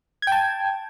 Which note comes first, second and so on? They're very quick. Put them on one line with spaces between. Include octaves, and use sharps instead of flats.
G#6 G5 A5